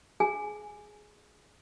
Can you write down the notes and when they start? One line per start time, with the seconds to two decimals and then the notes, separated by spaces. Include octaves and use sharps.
0.20 G#4 G#5